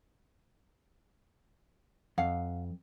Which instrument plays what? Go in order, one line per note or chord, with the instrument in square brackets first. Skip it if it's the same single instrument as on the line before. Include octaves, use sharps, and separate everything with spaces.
[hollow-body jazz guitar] F2 [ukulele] F5 F#5